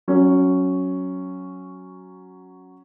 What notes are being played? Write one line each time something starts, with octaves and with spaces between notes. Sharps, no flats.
F#3 C#4